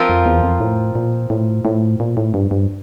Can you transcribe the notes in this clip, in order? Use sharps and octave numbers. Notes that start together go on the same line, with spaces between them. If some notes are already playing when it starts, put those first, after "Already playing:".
Already playing: F3 C4 F4 A#4
F2
E2
F2
A2
A#2
A2
A2
A#2
A2
G2
G2